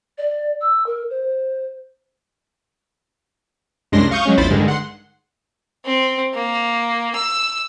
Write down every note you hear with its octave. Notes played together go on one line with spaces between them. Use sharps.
D5
E6
A#4
C5
C2 F#2 G#3 D4 C6 A#6
F5 C#6 D#6 G6
F#3 G#3 C#4
A#1 E2 E4 C5 B5 A6
G2 D3 D#3 G#3
F#5 C6
C4
A#3
E6